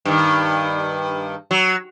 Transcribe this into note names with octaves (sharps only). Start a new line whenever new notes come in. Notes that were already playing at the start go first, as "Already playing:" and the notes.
G2 D#3
F#3